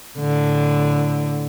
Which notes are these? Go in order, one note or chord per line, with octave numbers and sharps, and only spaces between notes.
A2 D3